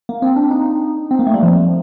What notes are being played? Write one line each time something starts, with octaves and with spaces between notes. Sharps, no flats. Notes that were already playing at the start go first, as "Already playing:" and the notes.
A#3
C4
D4
D#4
C4
A#3
A3
G3
F3